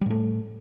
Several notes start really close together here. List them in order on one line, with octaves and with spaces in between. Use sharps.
G3 A2 A3